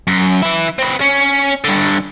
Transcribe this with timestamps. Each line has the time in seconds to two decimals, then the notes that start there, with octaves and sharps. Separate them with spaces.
0.07 F#2
0.43 E3 E4
0.79 C4 B4
1.00 C#4
1.64 G2 D3